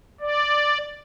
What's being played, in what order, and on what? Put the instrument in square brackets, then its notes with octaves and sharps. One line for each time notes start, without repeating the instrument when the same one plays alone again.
[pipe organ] D5